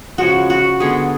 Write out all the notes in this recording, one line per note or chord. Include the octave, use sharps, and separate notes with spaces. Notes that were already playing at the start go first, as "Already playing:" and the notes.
C#3 F3 G#3 F#4
F#4
D3 G#3 B3 G#4